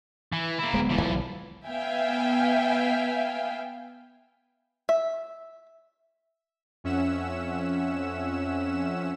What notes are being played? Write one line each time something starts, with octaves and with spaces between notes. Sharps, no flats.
E3
A#3 E4
D1 G#3 B3
E3 F3
B1
B3 E5 F5 G5 G#5
E5
F2 C#4 E5 F#5 E6 E7